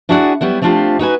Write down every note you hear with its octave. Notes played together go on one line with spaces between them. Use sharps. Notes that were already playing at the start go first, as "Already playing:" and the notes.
D4 E4 F#4 G#4 D5 F#5
F#3 G3 B3 E4
F3 A3 C4 D4 F4 G4
D#4 F#4 B4 G#5